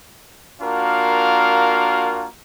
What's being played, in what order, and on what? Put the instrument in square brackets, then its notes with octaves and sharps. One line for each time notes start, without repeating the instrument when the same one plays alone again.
[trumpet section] A#3 D4 F4 F#4 A#4 F5